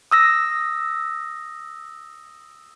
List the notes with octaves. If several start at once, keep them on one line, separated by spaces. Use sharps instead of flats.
D#6 E6 A#6